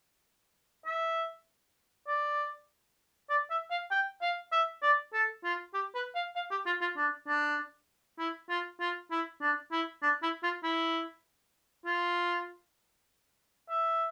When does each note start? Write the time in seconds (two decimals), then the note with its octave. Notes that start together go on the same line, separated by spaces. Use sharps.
0.85 E5
2.07 D5
3.30 D5
3.50 E5
3.70 F5
3.91 G5
4.21 F5
4.52 E5
4.82 D5
5.13 A4
5.44 F4
5.74 G4
5.95 B4
6.15 F5
6.35 F5
6.51 G4
6.66 F4
6.81 F4
6.97 D4
7.27 D4
8.19 E4
8.49 F4
8.80 F4
9.11 E4
9.41 D4
9.72 E4
10.02 D4
10.22 E4
10.43 F4
10.63 E4
11.86 F4
13.69 E5